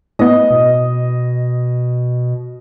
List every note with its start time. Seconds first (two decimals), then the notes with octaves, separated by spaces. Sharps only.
0.19 A2 B3 D#5
0.50 B2